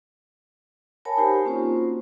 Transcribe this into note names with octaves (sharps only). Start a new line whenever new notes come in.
A#4 C#5 F#5 G#5 A5 B5
D#4 G4 C5
A#3 C4 C#4 F4 F#4 C5